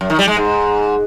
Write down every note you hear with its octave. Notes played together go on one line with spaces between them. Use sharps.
F#2
D#3
G3
G#3
G#2